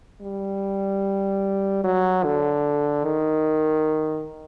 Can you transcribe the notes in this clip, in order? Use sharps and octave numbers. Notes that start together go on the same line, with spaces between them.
G3
F#3
D3
D#3